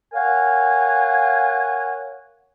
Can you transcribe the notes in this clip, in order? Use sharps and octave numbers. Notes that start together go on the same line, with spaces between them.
A#4 C#5 F5 F#5 G#5